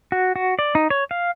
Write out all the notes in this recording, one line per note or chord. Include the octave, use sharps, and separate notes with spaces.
F#4
F#4
D5
D#4
C#5
F5